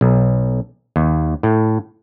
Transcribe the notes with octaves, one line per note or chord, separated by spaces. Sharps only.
B1
D#2
A2